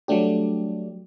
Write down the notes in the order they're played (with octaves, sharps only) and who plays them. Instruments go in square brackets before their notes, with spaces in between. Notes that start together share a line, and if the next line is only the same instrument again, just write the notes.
[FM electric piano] F#3 G3 A3 D4 G4